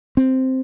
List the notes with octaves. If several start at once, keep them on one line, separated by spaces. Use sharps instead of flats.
C4